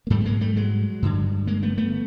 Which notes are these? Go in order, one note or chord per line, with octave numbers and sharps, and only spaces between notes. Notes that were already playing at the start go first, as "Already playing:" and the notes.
A#3
G#2 G3 A3
B3
G#3 A#3
G3 A3
F#3 G#3
G2 D3
G#3 A#3
A3 B3
A3 B3